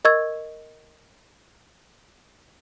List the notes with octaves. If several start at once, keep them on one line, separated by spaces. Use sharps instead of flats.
A#4 D#5 C#6 E6 G#6